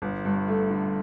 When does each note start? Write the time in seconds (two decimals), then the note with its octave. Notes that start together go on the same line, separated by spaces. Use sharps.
0.02 G1
0.25 G2
0.48 A3
0.70 D3